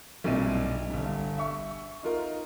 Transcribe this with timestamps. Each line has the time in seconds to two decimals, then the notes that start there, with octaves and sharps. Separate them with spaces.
0.24 B1 G2 A#2 C4 E4 D#7
0.90 G1 G2
1.38 E5 C#6
2.03 D#4 F4 A#4